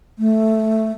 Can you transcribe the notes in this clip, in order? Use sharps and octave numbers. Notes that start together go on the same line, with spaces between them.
A3